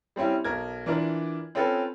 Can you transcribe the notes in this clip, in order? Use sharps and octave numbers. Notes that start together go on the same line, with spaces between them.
G3 C4 C#4 E4
B1 A#4 G#6
E3 D4 E4 F4 A#4 D5
C4 C#4 F4 A4 B4